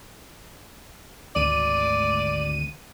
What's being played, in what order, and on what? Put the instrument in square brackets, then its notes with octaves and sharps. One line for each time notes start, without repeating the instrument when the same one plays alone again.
[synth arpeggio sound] G#1 D2 D#7 [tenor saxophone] D5